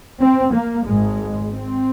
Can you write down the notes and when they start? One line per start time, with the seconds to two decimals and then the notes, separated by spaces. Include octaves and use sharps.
0.20 C4
0.53 A#3
0.86 G#1 G#2 G#3
1.52 C4